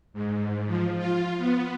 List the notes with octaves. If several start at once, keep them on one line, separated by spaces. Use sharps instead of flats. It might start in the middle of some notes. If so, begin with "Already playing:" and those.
G#2
F3
F4
B3